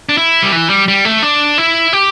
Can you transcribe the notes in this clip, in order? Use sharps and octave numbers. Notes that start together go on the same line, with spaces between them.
D4
E4
G3
E3
G3
G3
A3
D4
E4
G4